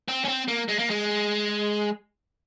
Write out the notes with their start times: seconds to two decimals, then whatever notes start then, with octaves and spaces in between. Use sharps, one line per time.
0.09 C4
0.25 C#4
0.28 C4
0.48 A#3
0.69 G#3
0.79 A#3
0.90 G#3